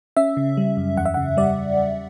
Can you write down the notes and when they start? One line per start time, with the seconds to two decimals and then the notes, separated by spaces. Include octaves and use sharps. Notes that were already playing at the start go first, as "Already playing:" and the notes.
0.17 C#4 E5
0.37 C#3
0.57 G3
0.77 F#2
0.97 E2 F#5
1.05 E5
1.14 C#3 F#5
1.37 G3 D5